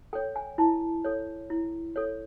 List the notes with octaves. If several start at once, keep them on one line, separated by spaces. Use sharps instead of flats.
A4 C#5 G5
G#5
E4 A5
A4 C#5
E4
A4 C#5